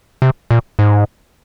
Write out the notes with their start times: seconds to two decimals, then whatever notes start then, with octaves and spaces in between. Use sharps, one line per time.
0.22 C3
0.51 A#2
0.79 G#2